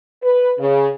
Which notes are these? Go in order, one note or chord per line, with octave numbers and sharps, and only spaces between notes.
B4
C#3